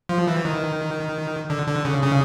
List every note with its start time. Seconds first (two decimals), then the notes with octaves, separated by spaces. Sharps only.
0.09 F3
0.27 E3
0.45 D#3
1.50 D3
1.67 D3
1.85 C#3
2.03 C#3